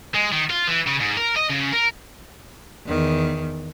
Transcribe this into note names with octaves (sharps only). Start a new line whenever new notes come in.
G#3
D#3
F4
E3
C#3
G#2
A#4
D#5
C#3
A#4
E2 D#3